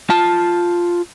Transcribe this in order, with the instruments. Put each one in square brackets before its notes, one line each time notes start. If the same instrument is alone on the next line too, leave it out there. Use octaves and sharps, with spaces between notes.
[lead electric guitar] F4 A5